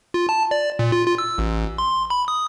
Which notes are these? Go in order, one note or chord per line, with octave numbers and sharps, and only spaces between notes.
F4
A5
D5
A#2
F4
F4
E6
A1
C6
B5
D#6